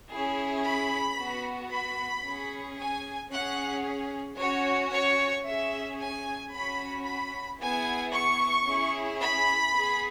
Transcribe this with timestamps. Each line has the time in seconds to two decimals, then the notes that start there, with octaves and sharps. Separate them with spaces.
0.11 C#4 E4 G#4
0.64 B5
1.18 B3 F#4
1.71 B5
2.25 C#4 G#4
2.78 G#5
3.32 C#4 G#4 F#5
4.39 C#4 F#4 C#5
4.92 C#5
5.46 C#4 G#4 E5
6.00 G#5
6.53 C#4 F#4 B5
7.06 B5
7.60 B3 E4 G#4 G#5
8.13 C#6
8.66 C#4 E4 G#4
9.20 B5
9.74 B3 G#4